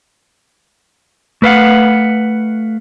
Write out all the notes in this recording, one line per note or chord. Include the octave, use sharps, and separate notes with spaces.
A3 B4 F5 F#5